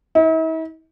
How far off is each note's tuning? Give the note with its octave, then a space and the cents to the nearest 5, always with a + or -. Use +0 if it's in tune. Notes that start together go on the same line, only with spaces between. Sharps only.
E4 -45